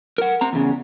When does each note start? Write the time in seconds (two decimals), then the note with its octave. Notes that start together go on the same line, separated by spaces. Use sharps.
0.18 A#4 F#5
0.41 C4 A#5
0.53 E2 C#3